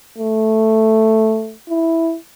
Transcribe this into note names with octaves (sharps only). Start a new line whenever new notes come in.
A3
E4